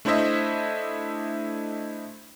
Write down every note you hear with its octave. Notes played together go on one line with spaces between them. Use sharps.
A3 D4 E4 C5 D#5 E5